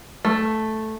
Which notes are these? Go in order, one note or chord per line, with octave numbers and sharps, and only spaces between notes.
A3